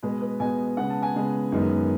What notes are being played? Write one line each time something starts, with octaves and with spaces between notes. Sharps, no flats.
B2 G#3 B3 B4
B4
B2 G#3 B3 G#5
C#3 G#3 B3 F#5
A5
G#5
C#3 G#3 B3
F#2 D#3 G#3 B3